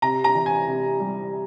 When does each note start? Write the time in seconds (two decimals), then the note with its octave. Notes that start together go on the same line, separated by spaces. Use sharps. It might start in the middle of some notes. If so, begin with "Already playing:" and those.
0.02 C3 A#5
0.24 A#5
0.35 E3
0.46 G#5
0.67 C3
1.00 G3